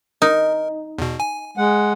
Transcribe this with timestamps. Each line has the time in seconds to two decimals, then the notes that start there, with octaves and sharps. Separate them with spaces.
0.22 D#4 A#4
0.98 E2 B2
1.20 G#5
1.57 G#3 F#5